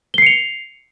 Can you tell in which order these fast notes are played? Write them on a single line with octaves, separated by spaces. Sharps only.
G7 C7 C#7 F7